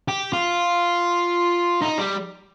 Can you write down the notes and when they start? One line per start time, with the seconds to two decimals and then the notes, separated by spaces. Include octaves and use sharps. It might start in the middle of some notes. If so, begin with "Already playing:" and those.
0.08 G4
0.33 F4
1.81 D#4
1.98 G3